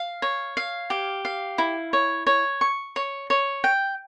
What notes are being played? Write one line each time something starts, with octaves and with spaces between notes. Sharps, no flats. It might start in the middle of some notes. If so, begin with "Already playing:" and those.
Already playing: F5
C#5
F5
G4
F5
E4
C#5
C#5
C#6
C#5
C#5
G5